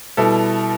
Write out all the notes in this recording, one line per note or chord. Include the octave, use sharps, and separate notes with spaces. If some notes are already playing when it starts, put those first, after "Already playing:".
B2 G3 E4 A4